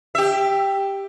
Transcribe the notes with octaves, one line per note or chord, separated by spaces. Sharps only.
G4 E5